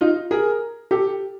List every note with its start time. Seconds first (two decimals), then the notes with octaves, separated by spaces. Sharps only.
0.01 D#4 F4
0.31 G#4 A#4
0.91 G4 A4